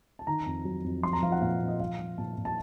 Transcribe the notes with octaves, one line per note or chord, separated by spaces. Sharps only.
A5
D#3 A#5
F2
F#3
F2
F3 C6
A#5
F3 F5
F#5
A#2 F5
A#2
D#5
F3 F5
F3
A#2 A5
A#2
A5